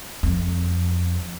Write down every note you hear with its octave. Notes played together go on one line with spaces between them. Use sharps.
F2